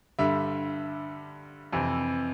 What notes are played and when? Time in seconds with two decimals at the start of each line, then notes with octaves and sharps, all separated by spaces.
0.19 G2 D3 G3 E5
1.72 F2 C3 E3